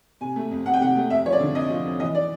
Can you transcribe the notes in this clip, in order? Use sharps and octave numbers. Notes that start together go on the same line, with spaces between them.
C3 G#5
A3
F2
F2 F#5
G5
C3 F#5
A3
F2 E5
F3 C#5
D5
D3
F2 D#5
F3
F2
E3 D#5
D5